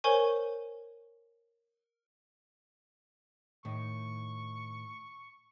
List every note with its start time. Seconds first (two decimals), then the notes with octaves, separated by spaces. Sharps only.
0.04 A#4 C5 C#5 G#5 C#6
3.65 A2 D#3 C#6